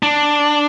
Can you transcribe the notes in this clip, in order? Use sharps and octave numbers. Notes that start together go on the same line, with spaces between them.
D4